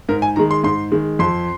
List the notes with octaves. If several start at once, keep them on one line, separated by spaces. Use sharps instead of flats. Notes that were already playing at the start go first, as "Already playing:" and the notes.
G#2 A#4
G#5
D#3 G#3 A#5
C6
G#2 C6
D#3 G#3
F2 C6